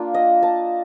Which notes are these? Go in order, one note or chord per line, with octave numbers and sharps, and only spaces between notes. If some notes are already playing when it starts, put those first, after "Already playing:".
Already playing: A#3 D4 F4
D#5
A5